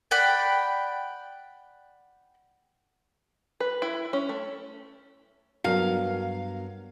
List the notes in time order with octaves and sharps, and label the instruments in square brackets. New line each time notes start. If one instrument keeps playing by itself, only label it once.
[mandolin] D5 F#5 G5 B5
[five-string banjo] B4
E4
C#4
A3
[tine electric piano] G2 B3 [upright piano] F#3 A#4 [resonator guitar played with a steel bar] F5